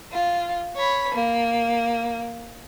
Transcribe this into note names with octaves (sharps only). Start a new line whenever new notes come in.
F4
C#5 B5
A#3